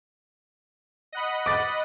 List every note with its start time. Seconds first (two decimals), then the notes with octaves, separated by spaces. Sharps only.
1.12 D#5 F#5 B5
1.46 D6 A6